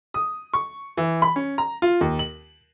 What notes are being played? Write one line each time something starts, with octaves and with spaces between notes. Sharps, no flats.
D#6
C#6
E3
B5
C#4
A#5
F4
D#2
F#7